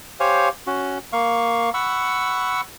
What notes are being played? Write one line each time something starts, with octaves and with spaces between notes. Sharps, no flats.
G4 C5 C#5 F5 G#5
C#4 F#4
A#3 F5 C#6
F#5 B5 C#6 E6